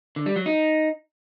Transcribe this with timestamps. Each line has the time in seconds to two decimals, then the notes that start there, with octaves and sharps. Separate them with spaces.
0.16 D3
0.26 G3
0.36 F#3
0.46 D#4